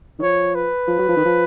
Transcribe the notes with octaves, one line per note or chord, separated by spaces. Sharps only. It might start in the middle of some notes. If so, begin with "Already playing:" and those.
D#3
F3 C#5
B4
F3
F#3
F3
D#3
F3